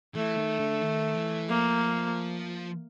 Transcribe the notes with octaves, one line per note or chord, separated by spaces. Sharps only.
E3 A3
D#3
D3
D#3
E3
F3 A#3